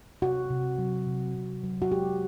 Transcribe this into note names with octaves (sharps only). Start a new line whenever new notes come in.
C3 F#4
C3
F#3
C3
C3
F#3
F#4
G#3 G4